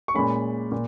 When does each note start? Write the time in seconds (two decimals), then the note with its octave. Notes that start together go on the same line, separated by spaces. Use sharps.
0.08 C#6
0.14 A#2 G#3 C#4 B5
0.72 A#2